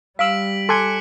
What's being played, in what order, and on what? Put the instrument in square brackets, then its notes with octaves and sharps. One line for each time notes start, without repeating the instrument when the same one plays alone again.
[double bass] G3 [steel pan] F5 E6 [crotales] B6 D7 F#7
[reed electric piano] A4 G#5 [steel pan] C6 [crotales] D6 F#6 C#7